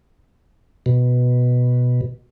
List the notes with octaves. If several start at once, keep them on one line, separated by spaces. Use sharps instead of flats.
B2